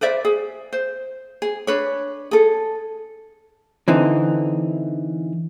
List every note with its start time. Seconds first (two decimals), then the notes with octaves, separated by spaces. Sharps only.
0.01 B4 C5 D5 E5
0.25 G#4
0.73 C5
1.42 G#4
1.67 D4 B4 C#5
2.31 G#4 A4
3.88 D3 E3 C4 D#4